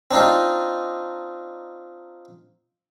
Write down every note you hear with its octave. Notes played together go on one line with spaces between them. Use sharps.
C4 D4 D#4 F4